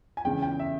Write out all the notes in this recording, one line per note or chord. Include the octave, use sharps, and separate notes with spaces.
G#5
E2 C#3 G#3 G5
G5
E5